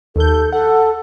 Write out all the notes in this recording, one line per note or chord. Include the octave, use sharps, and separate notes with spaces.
D#2 A4 G6
A4 F#5